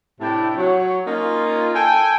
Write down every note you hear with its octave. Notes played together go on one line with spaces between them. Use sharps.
A2 C3 D4 E4 G5 A5
F#3 C#5
A#3 C#4 D#4 F4
A4 G5 G#5